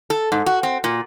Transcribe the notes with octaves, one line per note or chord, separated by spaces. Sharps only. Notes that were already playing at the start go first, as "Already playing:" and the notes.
A4
G#2
F#4
C4
A#2